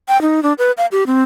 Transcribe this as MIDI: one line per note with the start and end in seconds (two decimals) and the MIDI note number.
0.08 0.20 79
0.22 0.43 63
0.43 0.53 62
0.58 0.72 71
0.77 0.86 77
0.92 1.04 67
1.07 1.23 60